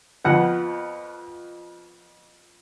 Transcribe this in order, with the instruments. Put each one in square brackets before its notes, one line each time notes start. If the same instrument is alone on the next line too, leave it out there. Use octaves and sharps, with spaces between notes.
[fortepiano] F2 F3 B3 F#5